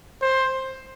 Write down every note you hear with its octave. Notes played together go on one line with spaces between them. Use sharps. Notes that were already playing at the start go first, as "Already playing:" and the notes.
C5